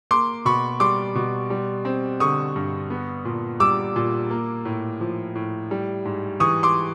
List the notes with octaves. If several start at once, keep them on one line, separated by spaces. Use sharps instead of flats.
A#3 C6 D6
B2 B5 C#6
G3 C6 D6
B2
G3
C4
D3 C#6 D#6
G2
B3
A#2
G3 D6 E6
A#2
A#3
A2
F3
A2
G3
G#2
E3 C#6 D#6
C6 D6